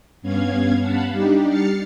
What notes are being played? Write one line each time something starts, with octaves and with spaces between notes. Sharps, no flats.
G2 B3 C#4 F5 G#6
F5 F#5 A5 B5
G3 D4 D#4 G4
F6 A6 C7 C#7